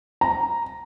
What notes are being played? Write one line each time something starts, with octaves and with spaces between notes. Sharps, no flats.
A#5